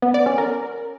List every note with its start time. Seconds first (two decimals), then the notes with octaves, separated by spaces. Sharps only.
0.02 B3
0.14 D5
0.26 C#4
0.38 A#4